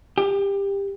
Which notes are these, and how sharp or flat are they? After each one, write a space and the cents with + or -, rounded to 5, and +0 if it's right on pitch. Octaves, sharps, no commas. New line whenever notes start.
G4 +20